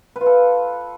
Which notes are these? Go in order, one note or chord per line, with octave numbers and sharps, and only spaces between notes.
B4
F4
A4